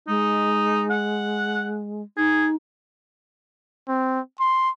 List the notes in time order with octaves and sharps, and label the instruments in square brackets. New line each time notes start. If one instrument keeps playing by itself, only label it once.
[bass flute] G#3 [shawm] D#4
[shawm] F#5
[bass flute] D#4 [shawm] G#4
[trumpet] C4
C6